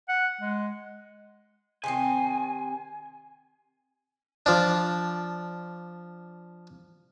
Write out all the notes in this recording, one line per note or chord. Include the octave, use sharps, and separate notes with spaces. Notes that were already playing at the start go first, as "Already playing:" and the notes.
F#5
G#3
C3 D#3 C4 G#5
F3 D4